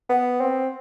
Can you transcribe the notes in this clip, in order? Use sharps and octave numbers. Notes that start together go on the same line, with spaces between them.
B3
C4